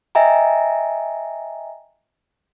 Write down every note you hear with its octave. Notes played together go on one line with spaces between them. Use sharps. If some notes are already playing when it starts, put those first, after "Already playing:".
D#5 E5 G5 G#5 A#5